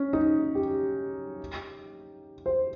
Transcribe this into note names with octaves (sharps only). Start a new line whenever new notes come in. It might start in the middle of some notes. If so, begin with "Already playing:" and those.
Already playing: C#4
D#4
G4
C5